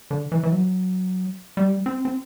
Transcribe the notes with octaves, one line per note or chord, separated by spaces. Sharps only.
D3
E3
E3
F#3
G3
C4
C4